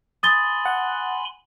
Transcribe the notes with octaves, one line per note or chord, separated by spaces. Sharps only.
G#5 B5 C6 D#6 A6 G7
F#5